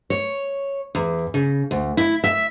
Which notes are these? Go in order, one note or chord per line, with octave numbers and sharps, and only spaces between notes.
C#5
E2
C#3
D2
E4
E5